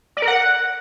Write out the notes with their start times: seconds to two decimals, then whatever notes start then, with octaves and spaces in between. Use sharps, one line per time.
0.17 D5
0.22 A#4
0.28 F#5